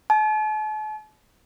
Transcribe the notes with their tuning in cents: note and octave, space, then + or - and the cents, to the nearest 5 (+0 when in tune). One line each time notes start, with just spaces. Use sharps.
A5 -45